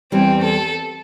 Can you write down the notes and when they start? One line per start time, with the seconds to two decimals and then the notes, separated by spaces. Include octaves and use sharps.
0.12 E2 E3 G3 C4
0.44 A4